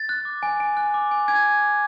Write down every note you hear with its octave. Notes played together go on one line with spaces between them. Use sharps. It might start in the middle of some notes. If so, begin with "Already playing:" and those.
Already playing: A6
F#6
D6
G#5
G#5
F#6
D6
G#5
G#5 G#6
F#6
D6